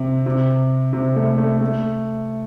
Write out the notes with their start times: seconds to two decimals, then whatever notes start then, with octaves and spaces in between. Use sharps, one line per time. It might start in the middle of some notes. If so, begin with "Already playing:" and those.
Already playing: C3
0.26 C3
0.93 C3
1.16 A3
1.38 A3
1.61 A3